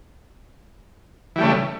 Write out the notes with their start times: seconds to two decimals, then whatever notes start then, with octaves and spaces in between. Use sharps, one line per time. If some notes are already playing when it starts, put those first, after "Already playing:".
1.36 E3
1.38 G3
1.41 A3
1.43 C#3